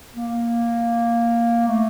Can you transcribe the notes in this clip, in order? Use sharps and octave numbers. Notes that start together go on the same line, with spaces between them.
A#3
A3